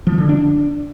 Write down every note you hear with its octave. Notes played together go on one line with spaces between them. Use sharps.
F3
D3
D4